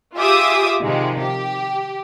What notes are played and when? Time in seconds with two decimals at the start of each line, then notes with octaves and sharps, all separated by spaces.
0.17 F4 G4 G#4 E5 D6 D#6
0.80 C3 D#3 F3 G#3
1.22 G4